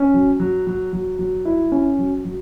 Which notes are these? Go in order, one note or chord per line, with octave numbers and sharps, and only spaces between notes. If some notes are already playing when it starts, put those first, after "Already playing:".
Already playing: C#4
F#3
F#3
F#3
F#3
F#3
E4
C#4
F#3
F#3